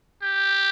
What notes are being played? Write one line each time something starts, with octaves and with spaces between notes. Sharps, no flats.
G4